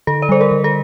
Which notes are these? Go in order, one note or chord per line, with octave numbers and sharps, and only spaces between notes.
D3 A4
D5
G3 C5
A#4
D3
A4